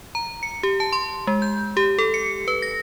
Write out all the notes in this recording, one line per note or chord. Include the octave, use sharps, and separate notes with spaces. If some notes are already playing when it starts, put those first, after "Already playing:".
A#5
C#7
G4
A5
C6
G#3
G6
G4
A4
C#7
B4
A#6